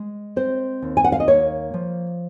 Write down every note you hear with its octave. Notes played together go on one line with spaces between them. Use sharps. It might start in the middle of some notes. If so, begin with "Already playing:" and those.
Already playing: G#3
C4 C5
D#2
G#5
F#5
F5
D#5
A#3 C#5
F3